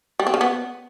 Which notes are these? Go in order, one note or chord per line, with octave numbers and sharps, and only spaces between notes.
G3
C4
C#3
B3